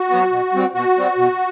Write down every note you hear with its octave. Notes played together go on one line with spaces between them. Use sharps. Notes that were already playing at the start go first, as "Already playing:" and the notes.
Already playing: F#4
F#3 B3
B2
G3 C4
B2 F#4
G3 C4
B2